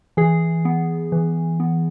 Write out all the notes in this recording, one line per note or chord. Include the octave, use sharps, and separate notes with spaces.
E3 G#4
B3
E3
B3